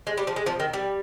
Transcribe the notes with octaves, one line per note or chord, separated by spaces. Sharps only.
G#3
G3
F3
G#3
F3
D#3
G3